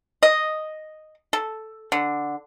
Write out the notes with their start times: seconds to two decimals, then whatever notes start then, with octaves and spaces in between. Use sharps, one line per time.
0.23 D#5
1.33 A4
1.92 D3